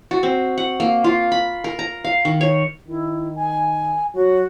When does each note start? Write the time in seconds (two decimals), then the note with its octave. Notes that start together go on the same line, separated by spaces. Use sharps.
0.11 F#4
0.23 C4
0.58 F#5
0.80 A#3
1.04 F4
1.32 B5
1.64 A#4
1.79 A#5
2.04 F5
2.25 D#3
2.41 C#5
2.88 D#3 E4
3.35 G#5
4.14 F#3 F#4